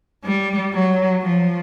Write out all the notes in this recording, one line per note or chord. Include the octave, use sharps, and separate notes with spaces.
G3
F#3
F3